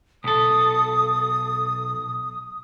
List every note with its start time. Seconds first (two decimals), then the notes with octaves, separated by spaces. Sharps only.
0.24 B1 A4 D#6